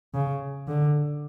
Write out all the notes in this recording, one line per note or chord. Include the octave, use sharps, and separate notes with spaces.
C#3
D3